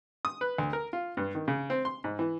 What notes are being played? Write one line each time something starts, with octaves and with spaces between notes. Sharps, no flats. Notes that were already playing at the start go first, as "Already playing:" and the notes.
D#6
B4
D2
A#4
F4
G2
D#3
C#3
C4
C6
G#2
E3